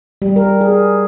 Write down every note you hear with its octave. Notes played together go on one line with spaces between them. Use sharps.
G3
A#4
G#4